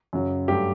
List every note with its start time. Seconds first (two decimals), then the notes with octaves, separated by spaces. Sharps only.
0.13 F#2 C#3 F#3
0.48 G2 F#3 A3 G4